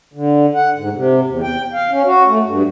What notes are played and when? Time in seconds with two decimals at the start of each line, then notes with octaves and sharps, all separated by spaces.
0.13 D3
0.54 F#5
0.76 G#2
0.93 C3
1.27 E2
1.43 G5
1.73 F5
1.91 C#4
2.05 F#4
2.27 A3
2.46 G2